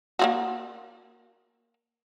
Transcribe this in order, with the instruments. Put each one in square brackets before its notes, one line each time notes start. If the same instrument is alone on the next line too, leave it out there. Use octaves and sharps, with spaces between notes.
[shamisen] A#3 F4 F#4